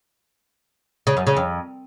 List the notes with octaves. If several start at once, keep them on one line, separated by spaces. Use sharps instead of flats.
C#3
F#2
C#3
F2